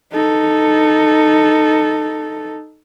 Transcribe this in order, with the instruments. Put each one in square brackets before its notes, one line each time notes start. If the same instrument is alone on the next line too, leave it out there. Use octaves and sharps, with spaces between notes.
[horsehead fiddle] D#4 A4